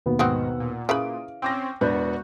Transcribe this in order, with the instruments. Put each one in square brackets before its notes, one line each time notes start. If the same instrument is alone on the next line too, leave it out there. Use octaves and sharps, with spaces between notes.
[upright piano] D#2 B2 B3
[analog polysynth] G#2 D#3 [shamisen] C4 D#4 F#4 [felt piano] F#5 E6
[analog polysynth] A#2
[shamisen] C#3 E3 B5 [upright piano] F5 [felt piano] D#6 D7
[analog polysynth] C4 C#4 [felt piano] G5 D6 A#6
[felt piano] E1 B3 D4 [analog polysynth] F#4 [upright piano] G6